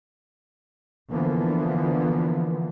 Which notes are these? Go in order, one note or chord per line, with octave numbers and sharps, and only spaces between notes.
D3 E3 F3 A#3 B3